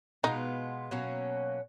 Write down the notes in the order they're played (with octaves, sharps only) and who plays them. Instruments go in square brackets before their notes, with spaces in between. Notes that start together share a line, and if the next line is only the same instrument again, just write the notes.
[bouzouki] B2 G#3 B3 F4 [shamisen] D#4
[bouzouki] B2 F#3 A#3 C#4